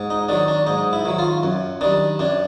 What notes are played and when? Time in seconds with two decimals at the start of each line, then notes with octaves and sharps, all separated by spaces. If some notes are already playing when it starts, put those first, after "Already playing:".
Already playing: G#2
0.10 D#4
0.29 D#3 F#3 D4
0.48 D4
0.67 G#2 D#4
0.93 E4
1.05 D#3 F#3
1.19 F4
1.43 F#2
1.81 D#3 G3 D4
2.19 F#2 D4